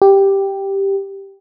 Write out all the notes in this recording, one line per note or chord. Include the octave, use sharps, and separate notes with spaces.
G4